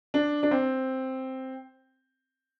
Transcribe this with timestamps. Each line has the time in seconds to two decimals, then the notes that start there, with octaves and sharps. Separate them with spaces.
0.14 D4
0.43 D4
0.51 C4